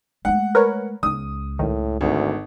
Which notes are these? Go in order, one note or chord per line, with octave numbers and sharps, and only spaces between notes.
G#3 A3 F#5
A#4 B4 C#5
C#2 D#6
A#1 A2 D#3
G#1 D2